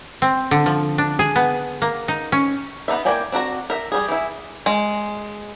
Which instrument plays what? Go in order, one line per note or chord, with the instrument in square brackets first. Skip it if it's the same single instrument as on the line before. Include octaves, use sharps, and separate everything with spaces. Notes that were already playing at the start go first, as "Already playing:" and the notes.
[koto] C4
D3
F3
D4
G#4
B3
A#3
D#4
C#4
[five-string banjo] B3 D#4 D5 E5
A#3 E4 D5 G5 G#5
C4 D4 F#4 A#5
A#4 E5
G3 G#4
E3 E4
G#3